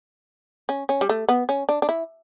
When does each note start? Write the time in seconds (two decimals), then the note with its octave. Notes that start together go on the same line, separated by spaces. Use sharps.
0.69 C#4
0.89 C#4
1.01 G3
1.09 A3
1.29 B3
1.49 C#4
1.69 D4
1.82 D4
1.89 E4